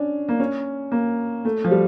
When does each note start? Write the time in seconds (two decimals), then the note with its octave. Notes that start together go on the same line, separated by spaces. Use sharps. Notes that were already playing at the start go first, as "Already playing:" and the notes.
Already playing: C#4 D4
0.29 A#3
0.40 C#4
0.92 A#3
1.45 A3
1.64 F3
1.71 G3